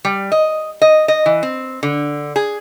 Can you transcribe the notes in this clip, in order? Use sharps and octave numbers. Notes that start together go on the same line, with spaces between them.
G3
D#5
D#5
D#5
E3
C4
D3
G#4